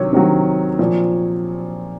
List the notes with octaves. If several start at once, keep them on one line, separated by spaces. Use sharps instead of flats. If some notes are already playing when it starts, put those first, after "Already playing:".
Already playing: C3 D#3 F#3 C#5
C3 D#3 F#3
A#2 F3